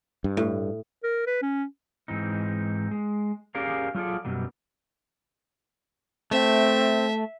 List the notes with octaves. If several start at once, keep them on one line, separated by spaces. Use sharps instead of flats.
G2
A2
A#4
B4
C#4
G#2 E3 C4 D#4
G#3
C#4 G4 G#4 A#4 D5 F5
F#3 F4 G#4 A4 D5
F#2 B2 F#3 G3
A3 C4 E5